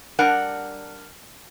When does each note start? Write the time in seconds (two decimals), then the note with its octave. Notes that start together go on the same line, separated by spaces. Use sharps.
0.19 G3 D4 A#4 F#5